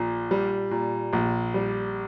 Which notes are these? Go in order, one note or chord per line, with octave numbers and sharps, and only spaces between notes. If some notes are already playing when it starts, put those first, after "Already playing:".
Already playing: A#1 A#2
G3
A#2
A#1
G3